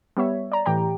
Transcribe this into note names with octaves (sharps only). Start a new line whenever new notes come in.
G3 B3 C#5 E5
D5 A#5
A2 E3 G4 G5 A#5